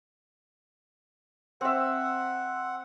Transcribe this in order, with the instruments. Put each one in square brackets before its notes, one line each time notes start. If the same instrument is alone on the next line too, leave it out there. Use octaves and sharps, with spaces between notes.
[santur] C4 E5 [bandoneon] F#5